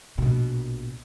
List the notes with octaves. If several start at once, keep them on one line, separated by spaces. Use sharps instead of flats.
A#1 B2